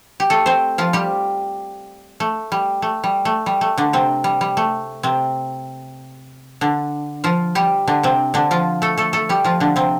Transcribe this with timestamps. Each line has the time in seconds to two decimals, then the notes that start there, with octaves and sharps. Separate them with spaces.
0.20 G4
0.30 A3 A4
0.46 C4 C5
0.78 F3 F4
0.93 G3 G4
2.20 A3
2.52 G3
2.82 A3
3.04 G3
3.25 A3
3.46 G3
3.61 A3
3.78 D3 D4
3.93 C3 C4
4.24 G3
4.41 G3
4.57 A3
5.03 C3 C4
6.61 D3 D4
7.24 F3 F4
7.55 G3 G4
7.88 D3 D4
8.03 C3 C4
8.34 D3 D4
8.51 F3 F4
8.82 A3 A4
8.98 A3 A4
9.13 A3 A4
9.29 G3 G4
9.44 F3 F4
9.60 D3 D4
9.76 C3 C4